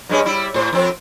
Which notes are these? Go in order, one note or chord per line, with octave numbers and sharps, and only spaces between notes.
G2 G#3 C#4
G3 E4
A2 C5
F2 C4